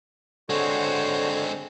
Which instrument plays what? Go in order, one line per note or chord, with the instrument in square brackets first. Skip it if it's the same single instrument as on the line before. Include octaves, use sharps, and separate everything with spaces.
[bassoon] D3 [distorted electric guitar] G#3 C4 [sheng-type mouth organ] F#4 C5 C#5